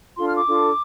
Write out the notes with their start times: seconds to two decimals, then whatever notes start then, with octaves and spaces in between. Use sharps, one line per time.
0.17 D4 F4 A4 C6
0.27 F6
0.36 D6
0.46 D4 F4 A4